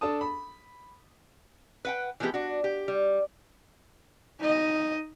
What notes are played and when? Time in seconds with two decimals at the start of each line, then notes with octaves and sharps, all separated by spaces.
0.01 D4 A4 A5 D#6
0.21 B5
1.85 B4 F#5 G5
2.20 E3 F3 G#3 B3 G4
2.34 D4 F#4
2.64 G4
2.88 G3
4.39 D#4 D#5